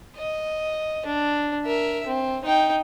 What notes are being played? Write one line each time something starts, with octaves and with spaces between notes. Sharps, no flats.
D#5
D4
A#4 E5
C4
D#4 G5